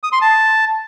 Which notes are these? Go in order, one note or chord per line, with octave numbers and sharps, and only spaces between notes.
D#6
C6
A5